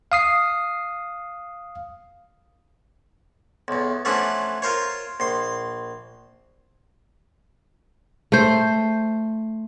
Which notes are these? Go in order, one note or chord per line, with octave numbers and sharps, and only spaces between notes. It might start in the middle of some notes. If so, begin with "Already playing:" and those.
F5 D#6 C7
B1 E2
E3 F3 A3 C#4 D4 F#4
F4 A#4 C5 C#5
A#1 C6
A3 C5